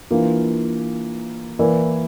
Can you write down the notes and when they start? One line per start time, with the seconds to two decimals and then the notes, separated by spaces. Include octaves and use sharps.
0.11 E3 A#3 D4 F4
1.59 E3 A#3 E4 A#4 D5